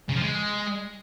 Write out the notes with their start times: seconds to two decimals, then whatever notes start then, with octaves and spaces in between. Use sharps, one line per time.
0.09 C#3
0.15 F3
0.22 G#3